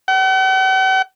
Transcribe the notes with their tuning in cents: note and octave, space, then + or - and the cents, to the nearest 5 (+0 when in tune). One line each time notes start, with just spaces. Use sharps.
F#5 +45